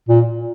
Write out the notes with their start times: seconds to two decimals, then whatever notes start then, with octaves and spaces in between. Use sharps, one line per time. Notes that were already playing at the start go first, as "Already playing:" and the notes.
0.09 A#2